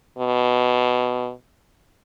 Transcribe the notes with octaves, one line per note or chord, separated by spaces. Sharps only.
B2